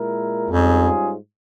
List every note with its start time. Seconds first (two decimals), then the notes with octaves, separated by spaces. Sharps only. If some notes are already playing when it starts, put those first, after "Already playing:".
Already playing: A#2 G#3 E4 A#4
0.50 F2 G#2 G3 C#4 F4 G#4